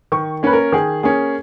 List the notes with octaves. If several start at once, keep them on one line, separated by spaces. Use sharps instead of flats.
D#3 C#6
A#3 C#4 B4
A#4
D#3 G#4
A#3 C#4 G#4